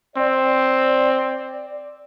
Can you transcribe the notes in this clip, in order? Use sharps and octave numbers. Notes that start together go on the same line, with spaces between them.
C4 D5